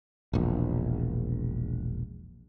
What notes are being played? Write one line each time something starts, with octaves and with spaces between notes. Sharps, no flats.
E1 A#1